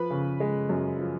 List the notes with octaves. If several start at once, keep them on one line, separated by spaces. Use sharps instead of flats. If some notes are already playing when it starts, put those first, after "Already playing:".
Already playing: F3 B4 B5
C#3
G#3
F#2
F3